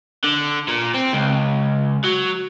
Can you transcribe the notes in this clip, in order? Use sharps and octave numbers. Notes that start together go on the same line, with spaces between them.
D3
A#2
C4
C#2
F#3